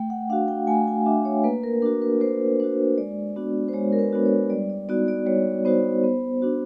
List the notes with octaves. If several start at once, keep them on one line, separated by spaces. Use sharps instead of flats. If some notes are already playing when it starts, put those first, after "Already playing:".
Already playing: A3 G5
F#5
D4 F#4 F5
G5
A3 G#5
G#5
D4 F#4 E5
C#5
A#3 B4
A#4
D4 F#4 A#4
B4
A#3 C5
D4 F#4 C5
G#3 D5
B3 D4 F#4
C5
G#3 C#5
A#4
B4
B3 D4 F#4
C#5
G3 D5
D5
B3 D#4 F#4 D5
D5
G3 C#5
B3 D#4 F#4 C5
B3
D4 F#4